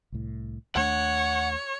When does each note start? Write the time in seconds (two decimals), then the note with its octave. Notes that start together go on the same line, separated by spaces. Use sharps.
0.12 C2 A2
0.76 D#2 A3 D4 C#5 F#5